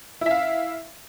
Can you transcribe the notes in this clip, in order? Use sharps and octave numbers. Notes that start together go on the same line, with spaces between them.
E4 E5 F5